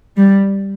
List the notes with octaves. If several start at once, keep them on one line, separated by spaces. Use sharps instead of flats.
G3